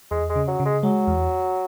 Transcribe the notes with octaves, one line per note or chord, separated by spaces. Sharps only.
E2 G#3
G#3
C#3
F#3
C#3
G#3
F#3 G#3
E2